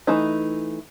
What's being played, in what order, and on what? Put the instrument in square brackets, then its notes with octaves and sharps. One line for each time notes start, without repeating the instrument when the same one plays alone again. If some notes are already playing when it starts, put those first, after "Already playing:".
[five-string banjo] E3 A3 D#4